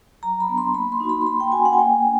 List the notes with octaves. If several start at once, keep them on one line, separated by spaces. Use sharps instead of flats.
F#3 A#5
B5
B3 D4
C6
A#3 B5
C6
D#4 F#4
B5
C6
A#3 B5
G5
C#4 F#4 G#5
F#5
G#5
A#3 G5
D4